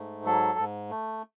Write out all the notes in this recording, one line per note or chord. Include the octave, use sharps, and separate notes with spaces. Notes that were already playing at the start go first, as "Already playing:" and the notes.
Already playing: G#2 A3
F#3 A4
G#2
A3